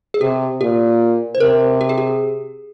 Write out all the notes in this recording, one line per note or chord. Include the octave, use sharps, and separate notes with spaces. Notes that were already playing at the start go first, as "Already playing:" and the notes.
G#4
C3 G4
A#2 G4
C5
C3 A#4
G4
G#4
G4